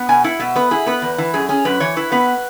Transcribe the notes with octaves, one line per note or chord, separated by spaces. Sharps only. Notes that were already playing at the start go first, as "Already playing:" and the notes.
Already playing: B3
B2 G#5
E4 F#5
B2 E5
B3 B4
E4 G#4
B3 B4
E2
E3
F#2 G#4
C#4 G#4
F#2 B4
E3 C#5
E4 B4
B3 B4